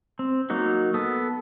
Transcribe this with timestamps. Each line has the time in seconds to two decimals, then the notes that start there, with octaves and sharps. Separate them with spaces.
0.19 C4
0.50 F#3 A#3 D#4 F#4
0.94 B3 A4 D#6